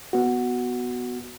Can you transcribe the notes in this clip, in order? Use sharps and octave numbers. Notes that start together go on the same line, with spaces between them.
B3 F#4